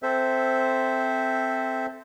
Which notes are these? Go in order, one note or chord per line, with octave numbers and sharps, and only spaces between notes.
C4 A4 C5 E5